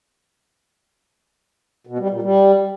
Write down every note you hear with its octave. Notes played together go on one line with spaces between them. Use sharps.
B2
G3
A#2
G3